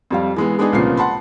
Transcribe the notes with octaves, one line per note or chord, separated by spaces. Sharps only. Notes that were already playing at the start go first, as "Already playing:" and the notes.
F2 G3 F5
E3 G#3 B3
G#3 B3 D4 D#4 G#4
C2 A#2 C#3 F3 B3 C7
F#5 A5 B5 C6